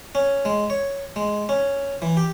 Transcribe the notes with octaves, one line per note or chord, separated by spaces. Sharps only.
C#4
G#3
C#5
G#3
C#4
E3
G4